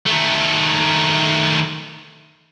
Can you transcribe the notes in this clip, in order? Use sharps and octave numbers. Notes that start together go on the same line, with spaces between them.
D#3 A3